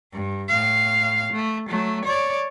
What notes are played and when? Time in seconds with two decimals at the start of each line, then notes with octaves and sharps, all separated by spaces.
0.13 G2
0.49 A2 F5
1.33 A3
1.69 F#3 A3
2.05 C#5 D5